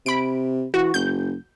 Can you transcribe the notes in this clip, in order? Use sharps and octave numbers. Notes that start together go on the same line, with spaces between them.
C3 B5 D7
E3 F#4
F#1 G6